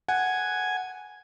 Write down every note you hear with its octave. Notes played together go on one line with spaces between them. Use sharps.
F#5 G#5